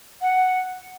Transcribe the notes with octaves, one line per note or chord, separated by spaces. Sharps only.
F#5